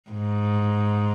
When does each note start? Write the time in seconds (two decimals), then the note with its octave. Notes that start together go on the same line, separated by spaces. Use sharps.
0.11 G#2